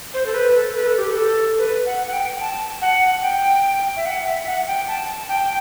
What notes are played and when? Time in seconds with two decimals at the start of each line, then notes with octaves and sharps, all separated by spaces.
0.14 C5
0.26 A4
0.34 B4
0.55 A4
0.75 B4
0.87 A4
0.98 G4
1.11 A4
1.59 B4
1.86 F#5
2.07 F#5
2.13 G5
2.40 A5
2.82 F#5
3.22 G5
3.97 E5
4.06 F#5
4.26 E5
4.46 F#5
4.67 G5
4.88 A5
5.29 G5